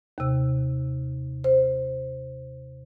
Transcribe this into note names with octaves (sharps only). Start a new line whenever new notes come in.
D#2 C3
C5